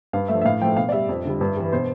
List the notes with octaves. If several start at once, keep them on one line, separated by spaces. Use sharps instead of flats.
G2 F5
F3 A3 E5
E5
A2 F5
F3 A3 G5
B2 F5
D5
G3 E5
F2
D3 G3
G2
E3 G3
B2 C5